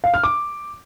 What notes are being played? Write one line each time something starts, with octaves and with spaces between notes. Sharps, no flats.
F5
F6
D6